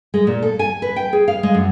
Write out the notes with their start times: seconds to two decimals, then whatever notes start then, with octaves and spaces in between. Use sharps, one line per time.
0.14 G#3
0.27 A#2
0.42 A4
0.59 G#5
0.82 B4
0.96 G5
1.13 G#4
1.28 F5
1.43 G#3
1.54 F#2